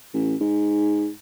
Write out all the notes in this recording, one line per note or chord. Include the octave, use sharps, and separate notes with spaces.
A1
G#2